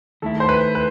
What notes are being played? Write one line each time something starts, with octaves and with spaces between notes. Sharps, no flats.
D#3 A3 E4 A4
C5
B4
B4